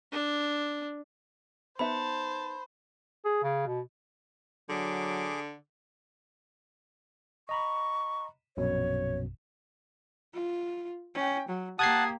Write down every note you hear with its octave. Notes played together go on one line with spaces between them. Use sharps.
D4
B3 D#4 C5 E5 A5 B5
G#4
C#3
B2
D3 F#3 G#4 D6
D#5 A#5 B5 C#6
A#1 F#2 B2 C#5
F4
C#4 G5
F#3
A#3 G4 F#5 A5 D#6 G#6 C7